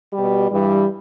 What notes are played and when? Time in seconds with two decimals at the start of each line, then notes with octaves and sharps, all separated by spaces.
0.12 B2 G3 G4
0.50 G2 E3 G3